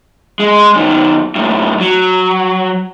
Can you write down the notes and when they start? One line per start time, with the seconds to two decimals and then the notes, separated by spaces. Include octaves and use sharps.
0.40 G#3
0.76 F#2 D#3
1.36 F#2 A2
1.80 F#3